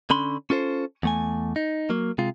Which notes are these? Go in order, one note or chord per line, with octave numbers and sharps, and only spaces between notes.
D3 C#4 B5 C6
C#4 F4 A4 C5
E2 A3 G#5
D#4
F#3 A#3
C3 G#3 F4